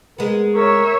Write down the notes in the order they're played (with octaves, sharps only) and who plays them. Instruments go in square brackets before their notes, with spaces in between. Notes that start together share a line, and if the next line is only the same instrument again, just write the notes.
[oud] G#3 B3 [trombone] A#4
[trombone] A#4 [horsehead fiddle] C#5 E5